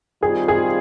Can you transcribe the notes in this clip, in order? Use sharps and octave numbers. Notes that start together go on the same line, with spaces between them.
D#3 G3 C4 F4 G#4
G#4